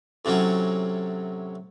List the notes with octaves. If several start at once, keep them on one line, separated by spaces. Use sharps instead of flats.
A2 C3 F#3 C#4